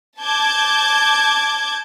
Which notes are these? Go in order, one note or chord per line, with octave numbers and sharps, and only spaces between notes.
A5 D6 G6 G#6